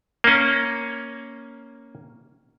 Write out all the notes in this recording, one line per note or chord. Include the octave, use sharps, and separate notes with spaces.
A#3 C#4